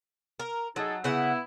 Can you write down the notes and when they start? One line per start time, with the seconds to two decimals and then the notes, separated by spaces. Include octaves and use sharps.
0.39 A#4
0.76 F#3 D#4 G#4 A4
1.04 C#3 B3 E4 F#5